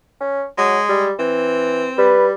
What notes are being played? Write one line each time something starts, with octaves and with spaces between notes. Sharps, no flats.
C#4
F#3 G#3
G3
E3 C4
G3 B4